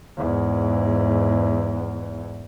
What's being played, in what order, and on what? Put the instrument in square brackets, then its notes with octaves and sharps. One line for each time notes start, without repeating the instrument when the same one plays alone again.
[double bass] E2 G#2